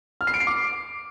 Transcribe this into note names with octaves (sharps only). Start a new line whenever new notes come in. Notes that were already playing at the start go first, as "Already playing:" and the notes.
F6
C7
D7
C7
D6